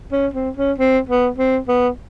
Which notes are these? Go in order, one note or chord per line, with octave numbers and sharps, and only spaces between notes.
C#4
C4
C#4
C4
B3
C4
B3